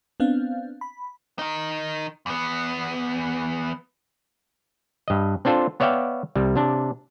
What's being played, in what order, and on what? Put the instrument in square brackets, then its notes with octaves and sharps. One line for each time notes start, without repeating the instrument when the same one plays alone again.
[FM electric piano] B3 C4 D4 F5
B5
[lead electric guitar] D#3 D#4
E2 B3
[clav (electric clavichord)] G2 D#5
C4 D4 F4 A4 C5
B3 C#5 D5 E5 F5 G5
C2 G3
C3 D4